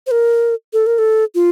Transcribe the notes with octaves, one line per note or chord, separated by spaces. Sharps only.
C5
A#4
A4
A#4
A4
F4